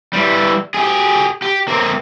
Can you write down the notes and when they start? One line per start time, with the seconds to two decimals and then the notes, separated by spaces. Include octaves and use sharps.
0.14 E3 G3
0.74 G4 G#4
1.42 G4
1.68 A#3 C4